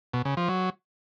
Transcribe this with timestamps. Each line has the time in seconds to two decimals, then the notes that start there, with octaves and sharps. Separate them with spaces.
0.13 B2
0.25 C#3
0.37 F3
0.49 F#3